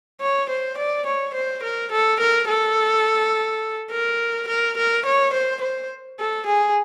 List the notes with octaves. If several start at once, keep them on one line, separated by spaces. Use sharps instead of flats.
C#5
C5
D5
C#5
C5
A#4
A4
A#4
A4
A#4
A#4
A#4
C#5
C5
C5
A4
G#4